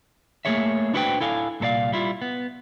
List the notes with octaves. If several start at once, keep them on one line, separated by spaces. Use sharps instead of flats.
A3 A#3 G#4 C#5 E5
D4 E4 F#4 B4 C5 G5
E4 A4 F5 G#5
C2 A#2 A4 D5 F5
G3 E4 F4
B3